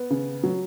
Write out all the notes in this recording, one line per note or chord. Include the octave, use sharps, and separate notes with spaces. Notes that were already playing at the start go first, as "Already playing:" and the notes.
Already playing: B3
C#3
F#3